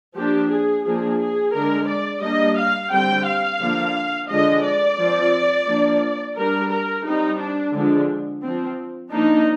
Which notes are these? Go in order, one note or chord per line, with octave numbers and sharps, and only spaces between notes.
F3 A#3 D4 G4
G#4
F3 A#3 D4 G#4
G#4
D3 G#3 D4 A#4
D5
G3 A#3 D4 D#5
F5
D3 G3 C4 G5
F5
D3 F3 A#3 D4
D3 F3 G#3 D4 D#5
D5
F3 C4
F3 A#3 D4
G3 D4 A#4
A#4
G3 C4 D#4
D4
D3 F3 G#3 D4
F3 C4
F3 A#3 D4 D#4